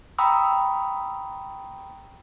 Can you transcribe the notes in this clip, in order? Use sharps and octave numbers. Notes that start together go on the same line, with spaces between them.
G5 A#5 B5 C#6 D#6 E6